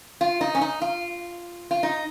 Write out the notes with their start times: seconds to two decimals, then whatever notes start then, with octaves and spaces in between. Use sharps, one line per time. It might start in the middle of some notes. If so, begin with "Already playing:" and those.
0.21 F4
0.41 D#4
0.55 C#4
0.61 D#4
0.82 F4
1.71 F4
1.83 D#4